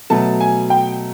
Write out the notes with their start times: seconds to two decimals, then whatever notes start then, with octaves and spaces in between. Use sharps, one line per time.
0.10 B2 F#3 A3 A5
0.40 G#5
0.70 G5